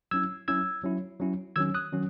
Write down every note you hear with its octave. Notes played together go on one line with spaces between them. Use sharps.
F#3 C#4 E4 E6 G#6
F#3 C#4 E4 E6 G#6
F#3 C#4 E4
F#3 C#4 E4
D#3 F#3 C#4 E6 G#6
D#6 F#6
D#3 F#3 C#4